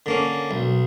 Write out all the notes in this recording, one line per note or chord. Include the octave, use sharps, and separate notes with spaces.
D3 A#3 C#4
B1